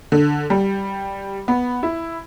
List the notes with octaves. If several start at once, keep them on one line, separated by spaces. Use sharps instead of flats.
D3
G3
B3
E4